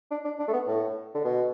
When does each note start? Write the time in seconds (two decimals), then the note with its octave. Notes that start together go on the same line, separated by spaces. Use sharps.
0.11 D4
0.25 D4
0.39 D4
0.48 A3
0.53 B3
0.67 A2
1.14 D3
1.24 B2